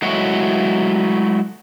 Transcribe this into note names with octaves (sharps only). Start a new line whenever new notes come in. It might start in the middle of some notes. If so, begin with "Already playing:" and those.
F#3 G#3 A3 E4 F#4 C#5